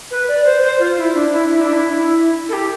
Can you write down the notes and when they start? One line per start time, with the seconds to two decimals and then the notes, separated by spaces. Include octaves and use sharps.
0.10 B4
0.28 D5
0.44 C5
0.63 C5
0.79 F4
0.97 E4
1.14 D4
1.31 E4
1.48 E4
1.61 D4
1.72 E4
2.48 A4
2.52 G4